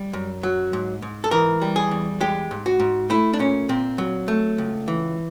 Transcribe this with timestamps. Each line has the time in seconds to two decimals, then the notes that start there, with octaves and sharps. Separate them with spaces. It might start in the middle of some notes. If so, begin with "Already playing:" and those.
Already playing: G3
0.13 F#2
0.43 F#3
0.73 G#2
1.02 G#2
1.24 A4
1.31 E3 A#4
1.62 G3
1.76 G#4
1.91 E2
2.20 G#3 G4
2.51 G#2
2.66 F#4
2.80 G#2
3.10 A3 E4
3.33 D4
3.39 A#2 C#4
3.69 A#2 C4
3.98 F#3
4.28 A3
4.58 C#2
4.88 E3